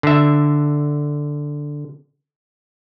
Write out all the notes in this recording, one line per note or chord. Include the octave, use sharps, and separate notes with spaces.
D3 E5